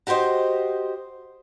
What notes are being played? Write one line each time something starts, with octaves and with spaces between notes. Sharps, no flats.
F#4 G4 B4 C5 D#5